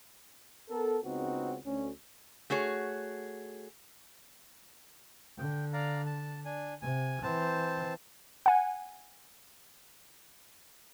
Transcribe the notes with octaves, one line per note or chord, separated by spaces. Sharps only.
B3 A4 A#4
C#2 C#3 B3 C4 D#4 F#4
D2 C#4
A3 F#4 G#4 C#5
D3 G5
D5 F5 A#5
A5
D4 G#5
C3 G#5
E3 C4 C5 A5
F#5 G#5